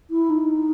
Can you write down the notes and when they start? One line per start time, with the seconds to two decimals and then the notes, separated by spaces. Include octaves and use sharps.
0.10 E4
0.30 D#4